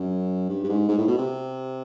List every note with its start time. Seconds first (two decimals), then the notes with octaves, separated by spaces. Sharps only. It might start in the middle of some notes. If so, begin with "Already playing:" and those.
Already playing: F#2
0.49 G2
0.64 G2
0.69 G#2
0.89 G#2
0.98 A2
1.08 B2
1.18 C3